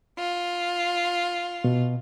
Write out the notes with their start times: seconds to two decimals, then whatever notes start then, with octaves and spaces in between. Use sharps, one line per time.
0.17 F4
1.64 B2